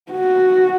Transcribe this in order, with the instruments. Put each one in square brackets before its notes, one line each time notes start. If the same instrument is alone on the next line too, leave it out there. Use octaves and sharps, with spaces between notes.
[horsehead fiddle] F#4